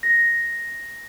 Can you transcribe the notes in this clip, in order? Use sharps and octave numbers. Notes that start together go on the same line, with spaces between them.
A#6